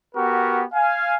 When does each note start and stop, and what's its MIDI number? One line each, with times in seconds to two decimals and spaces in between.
0.15 0.64 59
0.15 0.64 66
0.15 0.64 67
0.15 0.64 70
0.74 1.17 77
0.74 1.17 80